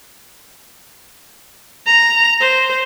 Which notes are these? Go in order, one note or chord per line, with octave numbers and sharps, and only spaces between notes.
A#5
C5